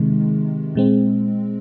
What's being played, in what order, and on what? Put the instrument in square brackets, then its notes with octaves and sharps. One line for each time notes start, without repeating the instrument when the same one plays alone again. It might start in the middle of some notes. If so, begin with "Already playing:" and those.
Already playing: [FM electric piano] C3 D#3 G#3
A#2 G#3 C4